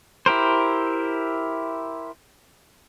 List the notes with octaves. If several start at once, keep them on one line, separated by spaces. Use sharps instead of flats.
E4 G4 A#4 C5